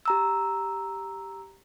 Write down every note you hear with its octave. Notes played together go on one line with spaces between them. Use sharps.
G4 A#5 E6